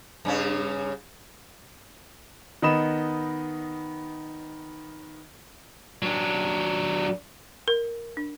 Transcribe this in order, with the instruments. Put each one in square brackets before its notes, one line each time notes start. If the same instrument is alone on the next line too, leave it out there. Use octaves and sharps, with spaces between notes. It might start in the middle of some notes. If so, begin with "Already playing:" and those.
[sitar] G2 C#3 C#4
[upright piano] D#3 B3 D#5 B5 E7
[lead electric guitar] F#3 D4
[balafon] A#4
D4